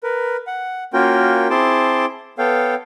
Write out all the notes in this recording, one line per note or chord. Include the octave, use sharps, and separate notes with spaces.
A#4 B4
F#5
A#3 C#4 F4 F#4 A#4 G5
C4 E4 G#4 A5 C6 D6
B3 A4 C#5 F5 G5